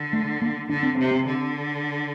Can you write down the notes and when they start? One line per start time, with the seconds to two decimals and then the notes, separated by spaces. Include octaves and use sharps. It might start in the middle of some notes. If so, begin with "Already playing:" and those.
Already playing: D3
0.13 A3
0.42 A#3
0.69 D3 D4
0.83 C4
0.97 C3 C4
1.11 C4
1.26 D3